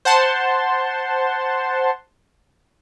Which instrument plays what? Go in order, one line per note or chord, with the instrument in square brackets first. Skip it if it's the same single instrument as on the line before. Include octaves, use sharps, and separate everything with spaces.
[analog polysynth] C5 F#5 A5 C6